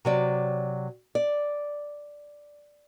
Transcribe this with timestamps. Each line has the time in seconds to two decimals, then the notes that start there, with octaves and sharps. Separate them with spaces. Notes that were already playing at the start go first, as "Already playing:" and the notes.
0.05 C3 F#3 D5
1.15 D5